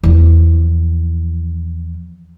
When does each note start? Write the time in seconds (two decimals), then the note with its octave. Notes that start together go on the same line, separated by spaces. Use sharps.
0.03 E2 F3